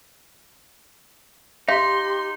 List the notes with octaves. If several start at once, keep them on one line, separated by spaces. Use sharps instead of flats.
D#4 G4 F5 C6